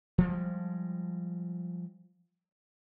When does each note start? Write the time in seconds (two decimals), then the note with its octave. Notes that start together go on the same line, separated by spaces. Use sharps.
0.18 F3 G3 G#3